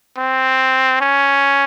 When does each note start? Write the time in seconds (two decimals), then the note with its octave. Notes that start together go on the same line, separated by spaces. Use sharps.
0.18 C4
1.01 C#4